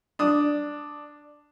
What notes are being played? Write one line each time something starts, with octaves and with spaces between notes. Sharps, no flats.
D4 D#6